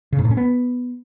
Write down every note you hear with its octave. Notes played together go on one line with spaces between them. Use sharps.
C#3
G#2
A2
C#4
B3